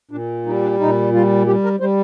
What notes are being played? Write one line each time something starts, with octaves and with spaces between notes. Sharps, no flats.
A#2 D4
G3 D#4
D4
A#2 D#4
G3 F4
G3 G4
A#4
G3 C5